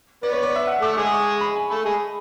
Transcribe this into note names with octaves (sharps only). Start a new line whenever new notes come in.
B3 B4 D5
C#5
D5
E5
F#5
A3 A4 D6
G#3 G#4 D6
C#6
B5
G#5
A3 A4 B5
G#3 G#4